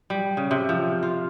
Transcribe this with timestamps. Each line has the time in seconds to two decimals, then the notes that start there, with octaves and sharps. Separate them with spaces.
0.10 G3
0.37 C#3
0.51 C3
0.69 F3
1.03 F4